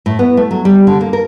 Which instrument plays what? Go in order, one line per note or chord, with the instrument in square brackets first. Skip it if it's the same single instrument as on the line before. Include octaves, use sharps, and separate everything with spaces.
[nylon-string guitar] A2
B3
A3
F#3
G3
D3
A#3
A#4